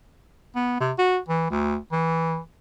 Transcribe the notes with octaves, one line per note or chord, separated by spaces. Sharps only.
B3
C3
F#4
E3
D2
E3